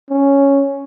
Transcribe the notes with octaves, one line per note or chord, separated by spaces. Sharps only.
C#4